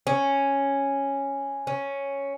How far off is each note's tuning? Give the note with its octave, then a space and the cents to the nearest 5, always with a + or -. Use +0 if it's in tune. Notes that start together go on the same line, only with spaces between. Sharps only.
C#4 -5
C#4 +0